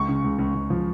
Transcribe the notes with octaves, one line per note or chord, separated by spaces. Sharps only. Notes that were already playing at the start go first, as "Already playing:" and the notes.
Already playing: C#2 C#6
C#3
C#2
C#2
C#2
F3